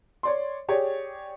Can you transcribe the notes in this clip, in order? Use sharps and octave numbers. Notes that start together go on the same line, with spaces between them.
C#5 D5 C6
G4 G#4 C#5 D5